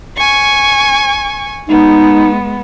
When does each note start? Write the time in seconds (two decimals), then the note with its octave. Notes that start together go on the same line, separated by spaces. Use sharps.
0.16 G#5 C#6
1.68 G#3 B3 D#4